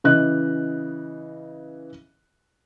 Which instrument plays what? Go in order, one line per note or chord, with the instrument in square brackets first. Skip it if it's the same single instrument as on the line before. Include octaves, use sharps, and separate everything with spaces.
[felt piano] C#3 E3 D#5 F#6